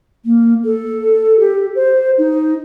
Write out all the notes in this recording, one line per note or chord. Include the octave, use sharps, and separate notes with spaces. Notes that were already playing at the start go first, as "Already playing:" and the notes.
A#3
A4
G4
C5
D#4